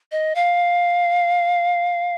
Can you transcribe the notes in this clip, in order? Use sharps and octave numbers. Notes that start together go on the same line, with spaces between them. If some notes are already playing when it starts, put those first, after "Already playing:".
D#5
F5